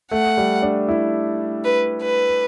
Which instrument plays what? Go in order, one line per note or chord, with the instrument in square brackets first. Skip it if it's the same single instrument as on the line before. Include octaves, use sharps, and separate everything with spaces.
[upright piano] A3 [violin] F#5
[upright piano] G3
D4
E4
[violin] B4
B4